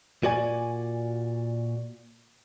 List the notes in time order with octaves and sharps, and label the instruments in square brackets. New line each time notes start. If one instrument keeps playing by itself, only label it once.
[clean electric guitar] A#2 F#4 D5 G#5